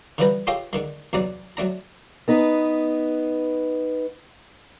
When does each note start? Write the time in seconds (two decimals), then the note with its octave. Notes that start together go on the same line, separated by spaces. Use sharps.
0.18 D3 E3 F3 G3 B4 A#5
0.47 F4 G4 A4 C#5 D#5 F5
0.73 D3 D#3 G#3
1.13 E2 C3 F#3 D#4 D5
1.57 F#3 A3 D4 A#5
2.28 B3 D#4 B4